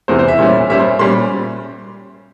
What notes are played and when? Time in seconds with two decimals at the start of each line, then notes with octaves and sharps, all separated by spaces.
0.08 E2 C3 E3 C5
0.19 C5
0.28 E5
0.39 A#2 G3 C#4
0.70 A#2 G3 C#4 E5
0.80 C5
0.99 A#2 G3 C#4 C6